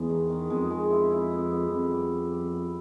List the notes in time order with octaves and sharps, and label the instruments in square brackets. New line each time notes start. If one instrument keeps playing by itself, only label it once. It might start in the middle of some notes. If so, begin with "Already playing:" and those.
Already playing: [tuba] E2 [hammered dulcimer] G#3 B3
[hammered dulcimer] D#3
D#3
[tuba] F2 [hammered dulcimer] G#3
[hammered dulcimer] G#3
E4
E4
B3
B3
[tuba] F2 [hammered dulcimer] G3
[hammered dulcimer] G3
G3
G3
B3